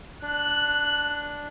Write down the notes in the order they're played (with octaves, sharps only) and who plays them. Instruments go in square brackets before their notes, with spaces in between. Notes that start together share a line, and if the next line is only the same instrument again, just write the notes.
[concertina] D4 [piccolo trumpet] F#6